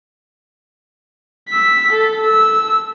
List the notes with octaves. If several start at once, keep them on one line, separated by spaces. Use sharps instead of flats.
E6 B6
A4
E6